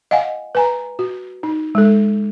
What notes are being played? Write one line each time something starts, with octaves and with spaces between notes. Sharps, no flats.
D#5 F5 F#5 G#5
B4 G#5 A#5
F#4
D#4
G#3 A4